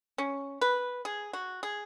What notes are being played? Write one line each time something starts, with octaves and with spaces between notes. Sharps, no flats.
C#4
B4
G#4
F#4
G#4